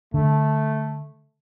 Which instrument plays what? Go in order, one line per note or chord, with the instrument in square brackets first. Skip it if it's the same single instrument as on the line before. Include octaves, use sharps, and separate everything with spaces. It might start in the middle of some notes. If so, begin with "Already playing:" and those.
[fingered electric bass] D3 [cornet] A3